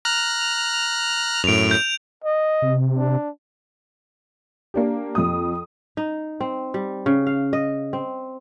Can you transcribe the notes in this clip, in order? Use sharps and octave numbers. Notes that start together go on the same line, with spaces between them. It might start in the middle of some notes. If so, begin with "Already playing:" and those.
A#5 F6 F#6
F#2 A2 D7 F7
G6
D#5
C3
D4
A#3 D4 G4
F2 D#6
D#4
C4
G3
C#3
F5
D#5
C4